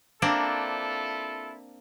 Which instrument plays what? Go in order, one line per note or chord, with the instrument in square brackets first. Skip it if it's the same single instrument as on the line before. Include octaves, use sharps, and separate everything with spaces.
[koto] A#3 C4 D4 [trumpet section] E4 F4 A4